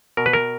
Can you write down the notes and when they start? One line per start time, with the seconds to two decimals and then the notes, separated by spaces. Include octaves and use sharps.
0.17 B2 A#4
0.26 B4
0.33 A#4